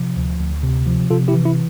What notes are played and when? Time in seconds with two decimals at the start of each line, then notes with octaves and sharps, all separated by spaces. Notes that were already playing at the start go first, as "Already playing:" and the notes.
Already playing: C3 F3
0.17 D2
0.40 D2
0.63 C3
0.87 F3
1.10 C3 F4 A4
1.28 E4 G4
1.34 E3
1.45 E4